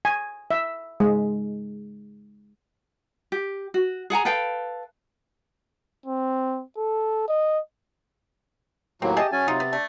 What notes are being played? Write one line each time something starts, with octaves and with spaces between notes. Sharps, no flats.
G#5
E5
G#3
G4
F#4
G#4 F#5 G#5 A#5
A4 B4 F5 G5
C4
A4
D#5
D#2 A2 F#3 A#3 C4
G4 G#4 D#5 E5 A5
F#3 C#4 G#5 A6
C3 D#4 F4
B3
A3 D4